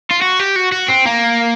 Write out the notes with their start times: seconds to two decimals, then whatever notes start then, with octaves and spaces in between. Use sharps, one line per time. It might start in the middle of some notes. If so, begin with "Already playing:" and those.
0.10 F4
0.21 F#4
0.39 G4
0.56 F#4
0.72 F#4
0.89 C4
1.06 A#3